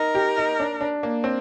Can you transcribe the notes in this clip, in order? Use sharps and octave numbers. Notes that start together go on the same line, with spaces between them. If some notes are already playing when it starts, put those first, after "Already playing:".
Already playing: D#4 A#4
G4
D#4
D4
D4
A#3
C4